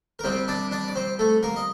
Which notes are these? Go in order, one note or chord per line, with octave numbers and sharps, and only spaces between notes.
A#4
C2 C3 G3 C4 C5
D4 D5
D4 D5
D5
C4 C5
A3 A4
A#3 A#4
D#5